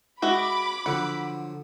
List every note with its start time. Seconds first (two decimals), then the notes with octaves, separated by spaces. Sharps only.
0.22 G#3 F#4 E5 B5 D6
0.86 D3 F3 F#3 F#5